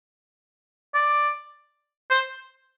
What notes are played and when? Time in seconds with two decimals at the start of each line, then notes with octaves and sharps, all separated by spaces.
0.94 D5
2.10 C5